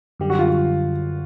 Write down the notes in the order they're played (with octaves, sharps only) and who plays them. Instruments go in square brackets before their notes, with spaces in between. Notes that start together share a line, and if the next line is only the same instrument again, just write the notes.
[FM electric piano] F#2 D3 G3 [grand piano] G4
[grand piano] F#4
F4
F#4